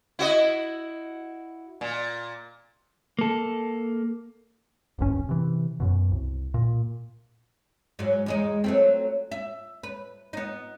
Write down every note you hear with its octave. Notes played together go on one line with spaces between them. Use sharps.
E4 F#4 D#5
A#2
A#3 A4
D1 G#1 G2 C#4
C3 E3
F#2 B2
C2
A#2
G#2 F#3
E2 G#3 D#4
F#3 A3 C4
E5
B4
B3 D#4